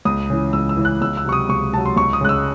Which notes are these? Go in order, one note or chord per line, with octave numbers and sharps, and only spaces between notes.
C#2 D#6
C#3 E3
C#2 E6
E6
C#3 E3
F#6
C#2 E6
E6
C3 F#3 C#6
D#6
C#2 C#6
C3 F#3 A5
C6
C#2 C#6
D#6
C#3 G#3 F#6
E6